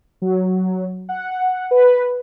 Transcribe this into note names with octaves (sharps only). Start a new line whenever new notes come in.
F#3
F#5
B4